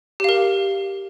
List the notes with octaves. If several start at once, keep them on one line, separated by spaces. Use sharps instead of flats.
G4 A#4 F5